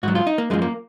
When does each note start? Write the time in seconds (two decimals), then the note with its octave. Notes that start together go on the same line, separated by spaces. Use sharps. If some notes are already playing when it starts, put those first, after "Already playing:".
0.03 G#2 F#3 F#4
0.15 F4
0.27 D#4
0.38 A#3
0.50 F#2 F3 G#3
0.62 A#3